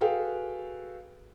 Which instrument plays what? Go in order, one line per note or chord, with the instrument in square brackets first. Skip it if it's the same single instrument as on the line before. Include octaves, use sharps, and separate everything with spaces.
[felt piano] F#4 G#4 A4 B4 F5 G5